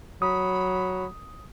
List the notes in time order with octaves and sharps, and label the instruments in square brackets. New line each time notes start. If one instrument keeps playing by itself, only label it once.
[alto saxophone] F#3 [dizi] B5 [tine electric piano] D#6